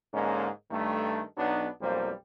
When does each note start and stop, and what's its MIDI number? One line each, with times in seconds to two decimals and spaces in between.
0.13 0.48 44
0.13 0.48 50
0.13 0.48 56
0.13 0.48 58
0.13 0.48 61
0.71 1.21 43
0.71 1.21 51
0.71 1.21 57
1.37 1.67 35
1.37 1.67 54
1.37 1.67 59
1.37 1.67 62
1.37 1.67 63
1.81 2.12 35
1.81 2.12 41
1.81 2.12 55
1.81 2.12 58
1.81 2.12 72